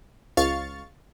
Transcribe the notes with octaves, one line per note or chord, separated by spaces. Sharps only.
C#2 F5 C#6 A6